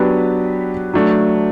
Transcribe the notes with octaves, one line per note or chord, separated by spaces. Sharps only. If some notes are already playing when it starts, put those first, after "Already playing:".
Already playing: F#3 B3 D4 G4 B4
F#3 A3 D4